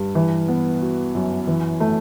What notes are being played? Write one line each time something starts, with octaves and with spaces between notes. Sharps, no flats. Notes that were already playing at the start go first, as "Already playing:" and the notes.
Already playing: G2
E3
B3
F#4
F#2
E3
A3